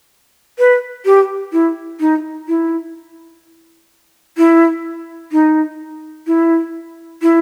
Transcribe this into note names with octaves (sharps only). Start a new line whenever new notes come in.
B4
G4
E4
D#4
E4
E4
D#4
E4
E4